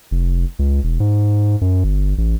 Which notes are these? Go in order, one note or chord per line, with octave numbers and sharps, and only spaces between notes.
F1
C#2
E1
G#2
F#2
G1
A1